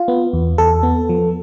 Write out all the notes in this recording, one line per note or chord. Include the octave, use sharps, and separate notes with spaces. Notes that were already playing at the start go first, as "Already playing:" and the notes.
Already playing: F4
B3
E2
E2 A4
B3
F3